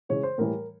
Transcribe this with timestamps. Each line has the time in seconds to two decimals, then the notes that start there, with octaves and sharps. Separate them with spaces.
0.09 C#3 E3 G#3 C#5
0.23 C5
0.38 A2 E3 G3 A#4